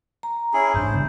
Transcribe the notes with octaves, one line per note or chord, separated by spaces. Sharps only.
A#5
C#4 E4 G#4
A1 G#2 D4 C5
C#3 G3 B3